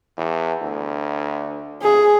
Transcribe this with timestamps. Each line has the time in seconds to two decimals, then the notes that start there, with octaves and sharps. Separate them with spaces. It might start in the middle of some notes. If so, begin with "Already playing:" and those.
0.17 E2
0.62 D2
1.83 C#3 G#4